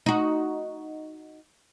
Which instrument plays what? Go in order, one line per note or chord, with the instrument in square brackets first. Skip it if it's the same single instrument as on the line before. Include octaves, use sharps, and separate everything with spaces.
[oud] D#4 F#4